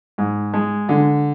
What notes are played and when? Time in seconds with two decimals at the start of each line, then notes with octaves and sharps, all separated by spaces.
0.18 G#2
0.53 G#3
0.89 D3